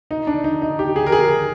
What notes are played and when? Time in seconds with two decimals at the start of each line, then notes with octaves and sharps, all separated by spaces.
0.11 D#4
0.27 D4
0.44 D#4
0.62 D#4
0.79 G4
0.96 G#4
1.06 A#4
1.12 G#4